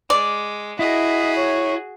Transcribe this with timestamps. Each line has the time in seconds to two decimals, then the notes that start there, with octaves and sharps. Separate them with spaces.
0.10 G#3 D5
0.79 E4 F#4 G#4 D#5
1.36 C#5